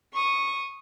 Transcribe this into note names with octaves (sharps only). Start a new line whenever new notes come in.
C#6 D#6